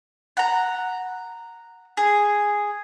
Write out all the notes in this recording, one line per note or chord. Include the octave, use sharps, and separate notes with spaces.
F#5 A#5
G#4